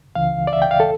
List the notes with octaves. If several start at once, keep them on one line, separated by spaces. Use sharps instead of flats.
C#2 C#3 E3 F5
D5
E5
G5
F5
A4